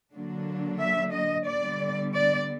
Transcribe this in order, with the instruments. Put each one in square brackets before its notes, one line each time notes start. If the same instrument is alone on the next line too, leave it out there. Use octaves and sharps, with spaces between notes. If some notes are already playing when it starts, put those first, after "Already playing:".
[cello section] D3 F#3 A#3 D4
E5
D#5
D3 G3 B3 D5
D5